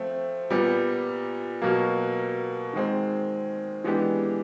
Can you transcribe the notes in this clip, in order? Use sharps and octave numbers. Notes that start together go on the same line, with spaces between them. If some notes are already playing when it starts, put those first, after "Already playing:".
Already playing: F3 A3 C4
A#2 G3 B3
B2 F#3 A#3
D#3 G#3 C4
E3 G#3 B3 D4 G4